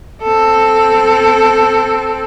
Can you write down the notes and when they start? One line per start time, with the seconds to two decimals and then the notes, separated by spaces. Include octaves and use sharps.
0.23 C4 A4